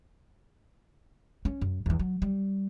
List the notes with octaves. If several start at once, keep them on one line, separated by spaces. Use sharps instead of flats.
C#4
F#2
E2 E3
F#3
G3